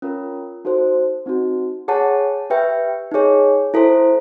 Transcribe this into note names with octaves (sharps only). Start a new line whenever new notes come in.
C#4 F4 A#4
D#4 F#4 A4 C5
C4 D#4 F#4
G#4 C#5 F#5 A5
G4 B4 E5 G5
D#4 G#4 C#5
E4 A4 C5